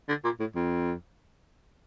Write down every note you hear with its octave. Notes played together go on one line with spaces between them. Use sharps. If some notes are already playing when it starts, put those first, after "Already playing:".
D3
A#2
A2
F2